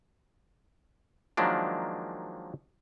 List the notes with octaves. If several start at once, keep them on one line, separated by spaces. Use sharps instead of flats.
D#3 F3 F#3 G#3 A#3 D4